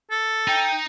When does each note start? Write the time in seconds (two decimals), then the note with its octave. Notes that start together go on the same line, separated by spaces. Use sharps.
0.11 A4
0.48 D#4 G5